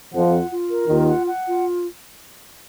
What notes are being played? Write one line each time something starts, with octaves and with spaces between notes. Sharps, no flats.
F2 F3 F#5
F4
F4
A#4
D#2 D#3 F4
F#5
F#5
F4